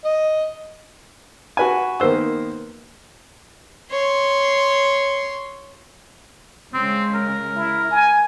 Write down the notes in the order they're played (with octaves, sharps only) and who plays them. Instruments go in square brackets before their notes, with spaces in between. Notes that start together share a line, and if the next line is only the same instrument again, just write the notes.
[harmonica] D#5
[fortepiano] F#4 B4 G#5
D#3 A#3 B3 C5 E6
[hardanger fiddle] C#5 C6
[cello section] C#3 G#3 [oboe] C4
[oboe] A#4
[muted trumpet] E4
G#5